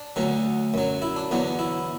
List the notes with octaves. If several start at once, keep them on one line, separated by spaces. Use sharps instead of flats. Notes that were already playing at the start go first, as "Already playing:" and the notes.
Already playing: D4
D2 D3 F#3
F#2 F#3
E4
D4
E2 D3 F#3
E4